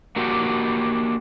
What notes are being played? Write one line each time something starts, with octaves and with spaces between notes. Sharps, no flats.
A#3 D4 F#4 G4